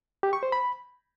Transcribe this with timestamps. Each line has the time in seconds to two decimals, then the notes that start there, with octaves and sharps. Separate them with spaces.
0.23 G4
0.33 C#6
0.43 C5
0.52 B5